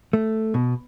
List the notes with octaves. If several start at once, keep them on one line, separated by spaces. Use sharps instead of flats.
A3
B2